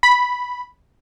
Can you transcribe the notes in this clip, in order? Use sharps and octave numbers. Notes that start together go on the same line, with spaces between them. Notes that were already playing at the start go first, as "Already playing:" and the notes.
B5